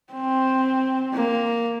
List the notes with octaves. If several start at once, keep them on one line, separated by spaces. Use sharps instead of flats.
C4
A#3